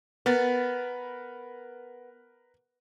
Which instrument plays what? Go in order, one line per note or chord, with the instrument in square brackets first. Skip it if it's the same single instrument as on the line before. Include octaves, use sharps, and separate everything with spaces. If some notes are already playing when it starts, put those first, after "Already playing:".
[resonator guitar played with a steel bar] B3 [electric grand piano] A#4 B4 A6